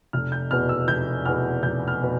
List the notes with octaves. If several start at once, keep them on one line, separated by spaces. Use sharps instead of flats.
F1 F6
G6
E2 B2 B3 F6
E6
F1 G6
E2 B2 B3 F6
F1 G6
F6
B2 B3